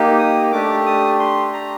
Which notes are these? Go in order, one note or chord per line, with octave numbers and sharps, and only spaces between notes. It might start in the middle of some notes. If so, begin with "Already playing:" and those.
Already playing: A#3 D#4 G4
D#6
A3 D4 G4 D6
D#6
C6
A#5